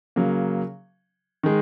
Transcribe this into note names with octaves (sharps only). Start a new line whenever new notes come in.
C#3 F#3 A#3
D#3 G#3